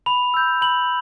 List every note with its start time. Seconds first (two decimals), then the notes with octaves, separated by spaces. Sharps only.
0.06 B5 F7
0.34 E6 G6
0.61 B5 F#7